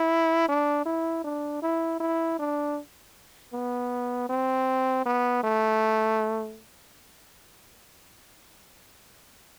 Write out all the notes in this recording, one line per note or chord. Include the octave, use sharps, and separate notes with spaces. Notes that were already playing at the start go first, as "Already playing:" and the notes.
Already playing: E4
D4
E4
D4
E4
E4
D4
B3
C4
B3
A3